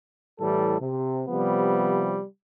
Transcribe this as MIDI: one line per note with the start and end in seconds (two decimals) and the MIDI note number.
0.38 0.76 45
0.38 0.76 52
0.38 0.76 55
0.38 0.76 69
0.79 1.22 48
1.27 2.20 48
1.27 2.20 53
1.27 2.20 55
1.27 2.20 59